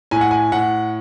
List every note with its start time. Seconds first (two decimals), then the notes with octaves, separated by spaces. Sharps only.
0.11 A2 G#5
0.21 F#5
0.31 G#5
0.52 A2 F#5